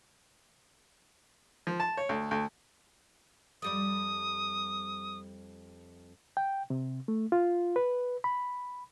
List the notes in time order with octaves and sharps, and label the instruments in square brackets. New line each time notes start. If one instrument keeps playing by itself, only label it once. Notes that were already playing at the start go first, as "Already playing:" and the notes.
[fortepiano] F3
A5
C#5
D2
D2
[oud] F2 G3 D5 [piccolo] D#6
[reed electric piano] G5
C3
A3
F4
B4
B5